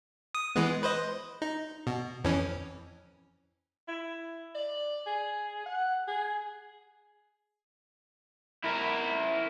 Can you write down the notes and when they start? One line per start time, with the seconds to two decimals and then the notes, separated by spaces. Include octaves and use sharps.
0.35 D#6
0.56 E3 G#3 B3
0.83 B4 C5 D#5
1.42 D#4
1.87 B2
2.24 F2 E3 C#4
3.88 E4
4.55 D5
5.07 G#4
5.66 F#5
6.08 G#4
8.64 E4 A#4